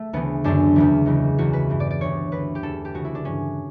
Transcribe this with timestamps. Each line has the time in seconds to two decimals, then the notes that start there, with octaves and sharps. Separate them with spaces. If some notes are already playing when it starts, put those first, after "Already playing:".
Already playing: A3
0.13 D2 C#3 E3 B3
0.44 F#2 D3 D4
0.76 E2 C#3 E3
1.06 C#2 C#3 E3
1.38 E2 C#3 E3 F#4
1.53 B4
1.70 G2 E3
1.80 D5
1.91 D5
2.00 D2 D3 C#5
2.32 D2 D3 B4
2.55 G4
2.63 E2 D3 A4
2.85 G4
2.94 D2 C#3 E3 F#4
3.05 E4
3.15 D4
3.25 G2 E3 C#4